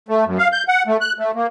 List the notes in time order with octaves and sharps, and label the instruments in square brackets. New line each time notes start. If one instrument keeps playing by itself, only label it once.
[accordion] A3
F#2
F5
G6
F#5
A3
F#6
A3
A#3